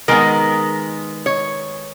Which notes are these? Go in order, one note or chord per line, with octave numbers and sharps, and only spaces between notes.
D#3 G#3 B3 A#4
C#5